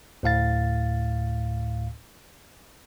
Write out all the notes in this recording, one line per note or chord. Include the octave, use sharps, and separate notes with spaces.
D2 A2 F5 A6